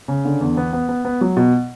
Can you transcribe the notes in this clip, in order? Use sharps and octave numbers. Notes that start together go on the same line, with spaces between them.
C#3
D3
E2
B3
B3
B3
B3
F#3
B2